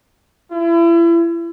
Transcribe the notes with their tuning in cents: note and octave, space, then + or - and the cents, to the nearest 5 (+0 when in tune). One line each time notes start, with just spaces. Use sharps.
E4 +35